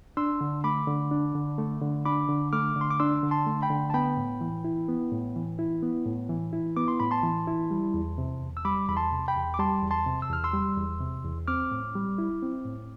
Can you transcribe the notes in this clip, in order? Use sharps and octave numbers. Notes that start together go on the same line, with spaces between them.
D4 C6 E6
D3
A3 B5 D6
D3
D4
D3
A3
D3
D4 B5 D6
D3
A3 D6 F6
D3
C6
D6
D4 C6 E6
D3
A5 C6
A3
G5 B5
D3
A5
B3 G5 B5
A2
E3
E4
B3
A2
E3
E4
B3
A2
E3
E4
B3 D6
C6
A2 B5
A5 C6
E3
E4
G3
E2
C3
E2
E6
G3 B5 D6
E2 B5
A5 C6
C3
G5 B5
E2
D6
G3 A5 C6
E2
A5 C6
C3
E6
E2 F6
C6 E6
G3
E2
C3
E2
C4 D6 F6
A2
G3
E4
C4
A2